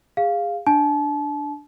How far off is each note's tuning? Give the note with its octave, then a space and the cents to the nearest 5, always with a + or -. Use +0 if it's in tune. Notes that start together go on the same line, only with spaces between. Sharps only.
G#4 -25 F5 +0
D4 +0 A5 -35